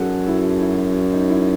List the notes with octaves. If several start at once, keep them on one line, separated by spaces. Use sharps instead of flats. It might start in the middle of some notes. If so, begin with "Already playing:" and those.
Already playing: F#2 F#4 G#4 A4
E4
E4
D#4
E4